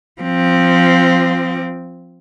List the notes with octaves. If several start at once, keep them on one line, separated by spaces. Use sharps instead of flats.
F3 C4